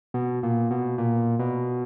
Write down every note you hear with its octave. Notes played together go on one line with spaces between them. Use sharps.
B2
A#2
B2
A#2
B2